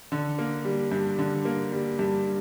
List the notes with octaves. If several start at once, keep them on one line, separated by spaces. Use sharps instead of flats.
D3
A#3
G3
G2
D3
A#3
G3
G2